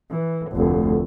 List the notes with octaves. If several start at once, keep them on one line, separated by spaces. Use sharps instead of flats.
E3
F1 D2